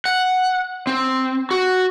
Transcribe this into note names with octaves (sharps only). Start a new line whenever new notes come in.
F#5
C4
F#4